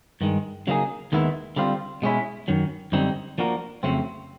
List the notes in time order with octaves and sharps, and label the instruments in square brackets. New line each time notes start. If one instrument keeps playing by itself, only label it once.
[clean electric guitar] G2 D#3 G#3
C#3 F#3 A#3 D#4 G#4
D#2 D#3 G#3 B3 E4
D3 G3 C4 F4
B2 G#3 C#4 E4
F#2 D#3 F#3
F#2 D3 G3 C4 D#4
F3 A#3 D4 F#4 A#4
F2 C#3 F#3 A3 C4